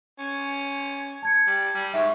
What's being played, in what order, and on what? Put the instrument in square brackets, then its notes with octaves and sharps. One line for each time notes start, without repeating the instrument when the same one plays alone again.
[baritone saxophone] C#4
[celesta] A5 G#6 C#7
[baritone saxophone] G3
G3
[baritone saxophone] G#2 [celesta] E5 C#6